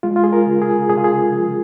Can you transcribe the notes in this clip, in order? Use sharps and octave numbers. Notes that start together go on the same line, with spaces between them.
G#3 F4
F4
G#4
A#4
C#3
G#4
C#3 G#4
F4
G#4
F3